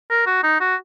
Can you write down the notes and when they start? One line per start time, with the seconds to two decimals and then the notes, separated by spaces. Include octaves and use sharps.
0.10 A#4
0.26 F#4
0.43 D#4
0.60 F#4